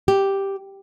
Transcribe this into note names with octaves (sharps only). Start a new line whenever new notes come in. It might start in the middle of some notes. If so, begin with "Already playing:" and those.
G4